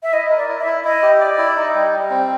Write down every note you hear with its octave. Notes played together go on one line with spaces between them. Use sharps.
E5
E4 D#5
A#4
D5
E4
E5
E4
E4 D#5
G4
D5
E4
D#4 D#5
G3
G3
C4